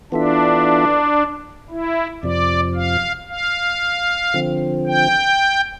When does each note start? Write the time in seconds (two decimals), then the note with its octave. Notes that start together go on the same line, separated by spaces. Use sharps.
0.12 E3 B3 D4 F4 A4 E5
1.70 E4
2.23 F2 C3 F3 D5
2.75 F5
3.29 F5
4.34 D3 F3 C4
4.87 G5